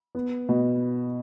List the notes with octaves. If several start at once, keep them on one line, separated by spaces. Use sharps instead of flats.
B3
B2